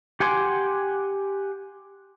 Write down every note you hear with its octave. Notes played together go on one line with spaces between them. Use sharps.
G4 F#5 G#5 C6 D6